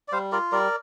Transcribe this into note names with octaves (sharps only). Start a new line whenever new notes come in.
D5
G3 C5 F5
F4 A#4 D5
G3 A#4 D5